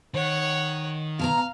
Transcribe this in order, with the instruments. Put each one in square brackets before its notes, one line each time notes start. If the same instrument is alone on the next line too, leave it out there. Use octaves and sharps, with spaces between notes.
[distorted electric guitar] D#3 [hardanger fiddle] C#5 F#5
[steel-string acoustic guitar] B2 A5 A#5 [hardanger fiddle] F5